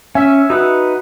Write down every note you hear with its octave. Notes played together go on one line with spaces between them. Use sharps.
C#4 E5 G#5
D#4 F#4 B4 F#5